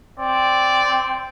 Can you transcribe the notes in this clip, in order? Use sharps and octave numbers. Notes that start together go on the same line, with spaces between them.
C4 D5